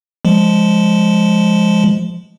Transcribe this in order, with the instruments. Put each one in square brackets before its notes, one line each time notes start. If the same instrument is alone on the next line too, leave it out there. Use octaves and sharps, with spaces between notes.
[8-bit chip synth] F3 G#3